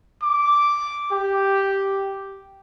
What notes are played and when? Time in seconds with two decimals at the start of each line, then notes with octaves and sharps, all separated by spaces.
0.23 D6
1.12 G4